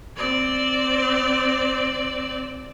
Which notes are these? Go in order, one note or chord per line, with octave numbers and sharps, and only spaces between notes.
C4 D5